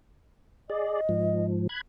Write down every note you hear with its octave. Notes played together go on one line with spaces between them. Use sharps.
G#4 D5 D#5
G#2 F3
B5 F#6 G#6